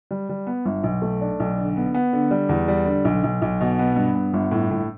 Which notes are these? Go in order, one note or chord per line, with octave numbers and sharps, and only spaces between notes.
G3
G3
B3
G1
B1
A3
D4
B1
D3
B3
B3
D3
G3
E2
G3
D3
B1
B1
B1
B2
B3
G2
B3
G1
A2
A2